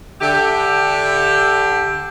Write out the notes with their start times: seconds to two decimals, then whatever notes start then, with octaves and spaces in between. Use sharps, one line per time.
0.21 D3 G4 E5